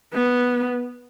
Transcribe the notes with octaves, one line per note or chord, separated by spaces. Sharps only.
B3